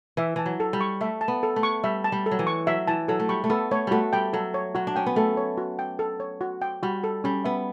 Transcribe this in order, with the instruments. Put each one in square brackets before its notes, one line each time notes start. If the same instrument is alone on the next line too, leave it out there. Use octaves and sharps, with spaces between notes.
[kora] E3 [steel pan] E5
[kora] E3 [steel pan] A5
[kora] F#3
[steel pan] A4
[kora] G3
[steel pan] C#6
[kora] A3 [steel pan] E5
[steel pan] A5
[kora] B3
[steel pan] A4
[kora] A3
[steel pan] C#6
[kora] G3 [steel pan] E5
[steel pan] A5
[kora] G3
[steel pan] A4
[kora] F#3
E3
[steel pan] C#6
[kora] F#3 [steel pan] E5
[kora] E3 [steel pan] A5
[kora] F#3 [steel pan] A4
[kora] A3
[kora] G3 [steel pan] C#6
[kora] A3
[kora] B3 [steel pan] A4
[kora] A3 [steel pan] C#5
[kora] G3 A3 [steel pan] F#4
[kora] G3 [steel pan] G5
[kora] F#3 [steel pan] A4
[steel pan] C#5
[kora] F#3 [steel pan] F#4
[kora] D4
[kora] C#4 [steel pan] G5
[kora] B3
[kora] A3 [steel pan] A4
[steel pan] C#5
F#4
G5
A4
C#5
F#4
G5
[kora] G3 [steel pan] F#4
[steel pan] A4
[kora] G3 [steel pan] C#4
[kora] B3 [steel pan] E5